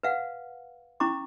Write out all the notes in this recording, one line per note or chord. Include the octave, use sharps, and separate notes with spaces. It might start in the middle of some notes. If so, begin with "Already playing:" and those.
B4 F5 F#5
C#4 E4 A#5 C#6 D6